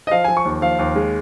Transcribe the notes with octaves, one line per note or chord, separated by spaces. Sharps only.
D#5
F3 F5
F3 G#5
C#6
D#2
F3 F5
D#2
G#3